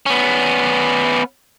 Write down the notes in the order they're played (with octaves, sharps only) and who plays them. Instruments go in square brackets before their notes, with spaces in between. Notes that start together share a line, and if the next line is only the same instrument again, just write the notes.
[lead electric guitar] B3 C#4